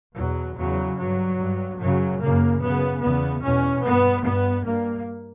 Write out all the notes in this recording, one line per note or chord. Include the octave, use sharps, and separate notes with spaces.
E2 B2 F#3
E2 C#3 F#3
G2 F#3
G2
F#2 C#3 F#3
F#2 C#3 A#3
F#2 C#3 B3
E2 C#3 B3
E2 B2 C#4
G2 B3
G2 B3
G2 A#3